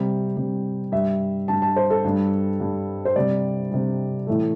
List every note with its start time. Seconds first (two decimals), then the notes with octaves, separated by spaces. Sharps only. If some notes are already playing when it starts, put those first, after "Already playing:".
Already playing: C3 G3
0.37 C3 G3
0.92 G2 G3 E5
1.48 G2 G3 A5
1.62 A5
1.76 C5
1.90 A4
2.04 G2 G3
2.60 G2 G3
3.05 C5
3.16 C3 G3 D5
3.71 C3 G3
4.27 A2 E3 A3